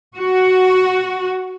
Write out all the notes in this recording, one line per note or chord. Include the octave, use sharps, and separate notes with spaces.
F#4